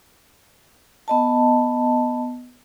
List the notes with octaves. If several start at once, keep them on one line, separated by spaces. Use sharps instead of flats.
B3 D#5 A5